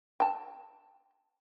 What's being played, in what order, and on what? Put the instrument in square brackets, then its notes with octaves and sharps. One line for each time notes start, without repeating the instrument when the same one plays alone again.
[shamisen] G5 A5